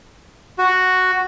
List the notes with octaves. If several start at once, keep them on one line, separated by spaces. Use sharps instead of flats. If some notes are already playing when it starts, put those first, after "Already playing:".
F#4